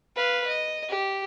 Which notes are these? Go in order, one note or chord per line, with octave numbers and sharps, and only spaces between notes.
B4 F5
D#5
G4